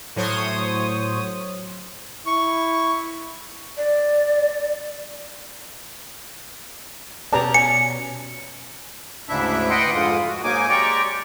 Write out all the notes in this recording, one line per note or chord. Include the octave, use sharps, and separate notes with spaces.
A2 F#3 C5 C#5 D#6
E4 C#6
D5
B2 C#4 G4 B4 D5 A5 A#5
G#5 C#7
D2 G#2 C#3 D4 E4 E5
B4 D#5 F#5 G5 C6
F2 G#2 D3 G#3 F4 D#6
F#4
G#2 F#3 A#3 D#4 G#5 D6
G#3 G4 D5 G5 A#5 C#6